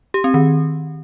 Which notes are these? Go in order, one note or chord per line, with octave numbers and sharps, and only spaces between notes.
G4
C4
D#3